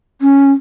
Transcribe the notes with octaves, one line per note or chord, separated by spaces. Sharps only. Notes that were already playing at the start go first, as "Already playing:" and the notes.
C#4